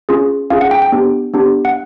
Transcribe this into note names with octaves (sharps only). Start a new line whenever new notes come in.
C#4 F4 G#4
C#4 F4 G#4 F5
F#5
G5
G5
B3 D4 G4
B3 D4 G4
F#5